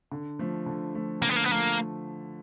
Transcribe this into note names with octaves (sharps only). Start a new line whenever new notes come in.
D3
F3 A3
D3
F3 A3
D3 A#3
B3
A#3
B3
F3 A3 A#3